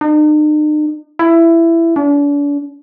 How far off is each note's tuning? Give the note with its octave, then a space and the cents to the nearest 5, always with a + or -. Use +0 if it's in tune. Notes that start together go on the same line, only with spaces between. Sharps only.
D#4 -45
E4 +15
D4 -40